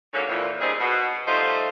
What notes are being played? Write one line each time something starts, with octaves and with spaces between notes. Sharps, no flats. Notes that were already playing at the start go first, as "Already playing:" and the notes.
G#2 D3 F#3 A#3 C#4
F2 A#2 E3
C#3 G3 C4 D#4 G#4
B2
F3 G3 A3 D#4 F4 C5